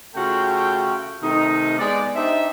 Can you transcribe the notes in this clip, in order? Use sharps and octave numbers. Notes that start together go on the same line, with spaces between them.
C#3 A3 F4 F#4 A4 G5
C3 D#3 A3 D#4
G#3 B3 D5
D4 D#4 G4 C5 E5